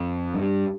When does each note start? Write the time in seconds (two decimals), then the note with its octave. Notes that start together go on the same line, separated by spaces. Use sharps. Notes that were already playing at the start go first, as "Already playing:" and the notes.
Already playing: F2
0.35 G2